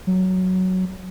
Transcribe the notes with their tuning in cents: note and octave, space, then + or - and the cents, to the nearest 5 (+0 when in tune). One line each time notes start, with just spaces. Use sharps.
F#3 +5